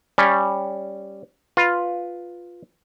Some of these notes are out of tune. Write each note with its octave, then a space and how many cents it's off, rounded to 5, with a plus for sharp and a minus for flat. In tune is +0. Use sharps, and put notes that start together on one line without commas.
G3 +5 C#4 +0
F4 +5 B4 +0